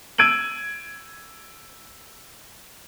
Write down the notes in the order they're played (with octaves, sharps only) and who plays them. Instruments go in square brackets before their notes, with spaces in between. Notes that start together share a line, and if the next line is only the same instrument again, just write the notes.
[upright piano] E6 G#6 D7 D#7 F#7